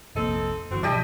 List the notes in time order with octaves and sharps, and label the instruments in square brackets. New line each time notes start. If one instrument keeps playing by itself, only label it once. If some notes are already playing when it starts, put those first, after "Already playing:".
[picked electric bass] F1 A#1 A#3 [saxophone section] C4 D#4 A4
[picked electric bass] G1 E3 [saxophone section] C4 F#4
[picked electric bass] B2 F3 F#3 [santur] D4 G4 D#5 [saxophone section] E4